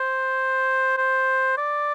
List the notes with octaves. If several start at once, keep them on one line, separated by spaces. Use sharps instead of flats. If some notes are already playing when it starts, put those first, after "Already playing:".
Already playing: C5
C5
D5